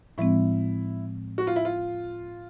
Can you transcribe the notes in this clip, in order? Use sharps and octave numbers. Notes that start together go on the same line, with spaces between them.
A2 F3 G#3 C4 E4
F#4
F4
E4
F4